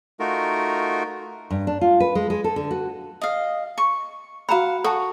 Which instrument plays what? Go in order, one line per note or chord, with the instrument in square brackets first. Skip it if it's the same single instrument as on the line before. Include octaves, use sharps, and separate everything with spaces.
[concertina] A3 D#4 F4 F#4 A#4
[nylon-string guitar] G2
D4
F4
B4
G#3
G#3
A4
D3
F#4
[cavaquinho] D#5 F5
C#6
[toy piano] F#4 A#5 B5 [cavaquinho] F5 F#5
[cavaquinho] F#4 C#6 [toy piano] A4 A5